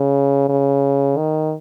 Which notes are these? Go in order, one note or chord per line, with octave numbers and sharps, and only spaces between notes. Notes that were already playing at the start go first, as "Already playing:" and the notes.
Already playing: C#3
C#3
D#3